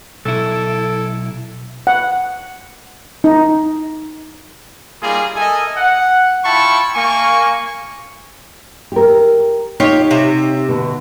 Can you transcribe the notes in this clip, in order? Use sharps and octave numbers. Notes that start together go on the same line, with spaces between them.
B1 E4 A4
F#5
D#4
G3 A#3 D#4 F4 G#4
A4 A#4 D#5 E5 G#5
F#5
E4 F4 G5 A5 B5 C#6
A#3 G#5 C#6
G4 A#4
D#4 F4 G4 C#5 D#5
C3 E5
B2 D3